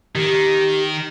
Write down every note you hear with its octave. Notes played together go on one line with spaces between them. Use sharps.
D#3 G4